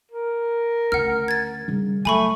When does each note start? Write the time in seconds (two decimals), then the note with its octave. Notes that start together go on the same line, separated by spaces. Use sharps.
0.11 A#4
0.92 D2 C#3 F#5 F6
1.28 G#6 A6
1.68 C#3 G3
2.05 F#3 A3 E4 G#5 B5 C#6